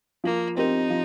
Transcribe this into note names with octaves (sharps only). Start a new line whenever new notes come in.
F3 A#3
C4 D#4 G4 A#4
F3